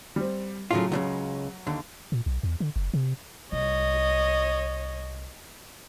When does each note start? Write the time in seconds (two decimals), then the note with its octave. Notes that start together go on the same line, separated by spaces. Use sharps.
0.16 G3 C4
0.71 A2 C#3 F#3 A3 F4
0.92 C#2 A2 C#3 F#3
1.67 D#2 D3
2.12 A#2
2.26 B1
2.43 E2
2.60 D3
2.76 F#1
2.94 C3
3.52 C2 C#5 D#5